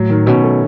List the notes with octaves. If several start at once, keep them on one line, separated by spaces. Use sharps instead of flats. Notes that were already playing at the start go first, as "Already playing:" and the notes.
Already playing: A2 F#3
D#3
B2 C#4
A3